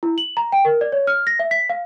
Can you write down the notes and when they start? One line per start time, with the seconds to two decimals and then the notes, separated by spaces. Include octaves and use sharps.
0.03 E4
0.18 F#7
0.37 A#5
0.52 G5
0.65 A#4
0.81 D5
0.92 C#5
1.07 F6
1.27 A#6
1.39 E5
1.51 B6
1.69 F5